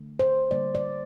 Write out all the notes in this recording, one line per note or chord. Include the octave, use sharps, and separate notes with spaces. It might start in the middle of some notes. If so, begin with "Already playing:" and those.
Already playing: D3 A3
C5
D3 G3 A#3 D5
D5